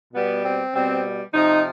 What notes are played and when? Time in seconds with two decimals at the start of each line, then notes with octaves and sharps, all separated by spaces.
0.13 B2 G3 B3
0.44 C4
0.74 B2 G3 C4
1.33 C3 F3 D#4